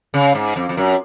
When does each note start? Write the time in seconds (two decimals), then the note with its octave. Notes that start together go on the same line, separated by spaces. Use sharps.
0.14 C#3
0.35 G#2
0.56 F2
0.69 F2
0.77 F#2